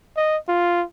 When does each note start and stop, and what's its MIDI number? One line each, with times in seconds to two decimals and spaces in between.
0.17 0.37 75
0.48 0.84 65